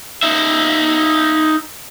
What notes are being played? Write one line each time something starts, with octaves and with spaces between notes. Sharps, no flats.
D#4 E5